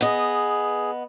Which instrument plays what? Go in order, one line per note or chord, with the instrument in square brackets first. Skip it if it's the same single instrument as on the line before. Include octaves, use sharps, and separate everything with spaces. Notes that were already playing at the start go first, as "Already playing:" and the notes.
[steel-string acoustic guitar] B3 D#5 [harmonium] G#4